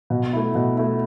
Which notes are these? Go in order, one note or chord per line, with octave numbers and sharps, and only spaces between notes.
B2
A3 E4
B2
A3 E4